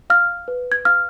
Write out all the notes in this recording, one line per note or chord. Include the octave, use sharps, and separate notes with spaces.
F5 F6
B4
G#6
F5 F6